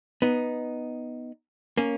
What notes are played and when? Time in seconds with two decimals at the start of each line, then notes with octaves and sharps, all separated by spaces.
0.22 B3 D#4
1.77 A#3 C#4